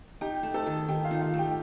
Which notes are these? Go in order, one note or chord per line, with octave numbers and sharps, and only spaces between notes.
D#4 G4 G5
A3
A4 A5
D#3
D#3 G4 G5
F4 F5
D#4
F4 F5
A3
G4 G5